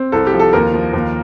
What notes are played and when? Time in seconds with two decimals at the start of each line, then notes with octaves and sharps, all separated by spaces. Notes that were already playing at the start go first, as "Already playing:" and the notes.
Already playing: C4
0.12 C2 A4
0.27 G4
0.33 F3
0.40 A4
0.53 D#2 A#4
0.74 F3
0.93 D#2